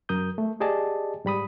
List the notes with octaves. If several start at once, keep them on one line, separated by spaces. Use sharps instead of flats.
F#2 A#4 D#6 G6
A3
G4 G#4 D5 D#5 A5
G#2 G3 B5 D#6